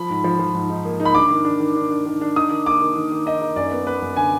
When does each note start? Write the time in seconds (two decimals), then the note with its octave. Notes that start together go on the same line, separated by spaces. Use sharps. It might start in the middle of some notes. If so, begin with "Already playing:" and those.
Already playing: F3 B5
0.10 G#2
0.24 F3
0.39 F3
0.55 G#2
0.70 D#4
0.85 A#3
1.00 D#4
1.05 B5
1.15 D4 D6
1.30 D#3
1.45 D4
1.60 D#3
1.76 D4
1.91 D4
2.06 D#3
2.21 D4
2.36 D#4 D#6
2.51 D#3
2.66 A#3 D6
2.81 D#3
2.96 D#3
3.12 D#3
3.26 D#4 D#5
3.41 D#4
3.56 F#2 D5
3.71 B3
3.87 B3 B4
4.02 F#2
4.16 D3 G#5